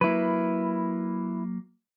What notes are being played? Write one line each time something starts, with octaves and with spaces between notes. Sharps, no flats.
F#3 A#3 E4 B4